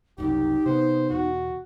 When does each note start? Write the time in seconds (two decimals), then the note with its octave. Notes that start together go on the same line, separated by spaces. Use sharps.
0.18 F#1 C2 F#2 D#4 G4
0.66 C3 B3 C5
1.10 E2 B2 F#4